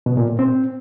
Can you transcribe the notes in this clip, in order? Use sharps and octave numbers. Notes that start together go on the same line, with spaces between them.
B2
A#2
A2
C4